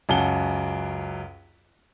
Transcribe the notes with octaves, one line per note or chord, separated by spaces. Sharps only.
C#2 F#2 F#5 A5 G7